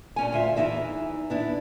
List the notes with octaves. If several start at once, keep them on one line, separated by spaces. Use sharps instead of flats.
A#2 C#4 G#5
D2 F4 E5
E2 G#2 E3 D#4 E5
B3 D4 E4